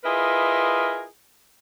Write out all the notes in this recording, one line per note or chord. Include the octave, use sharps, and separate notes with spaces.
E4 F4 G#4 A#4 B4 D#5